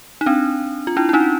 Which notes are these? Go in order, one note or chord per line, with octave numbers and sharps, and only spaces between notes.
D#4
C4 D4
F4
D4 E4
E4
C#4 D#4